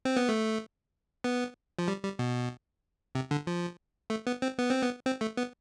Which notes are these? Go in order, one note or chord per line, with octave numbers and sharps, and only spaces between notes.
C4
B3
A3
B3
F3
G3
G3
B2
C3
D3
F3
A3
B3
C4
B3
C4
B3
C4
A3
B3